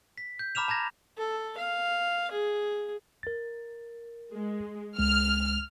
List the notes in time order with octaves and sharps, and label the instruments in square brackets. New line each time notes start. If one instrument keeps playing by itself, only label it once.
[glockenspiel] B6
G6
A#5 B5 D6 F6 E7 F7
A5 A#5 G#6 A#6
[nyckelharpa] A4
F5
G#4
[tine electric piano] A#4 A6
[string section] G#3
[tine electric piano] C#2 G#3 [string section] F6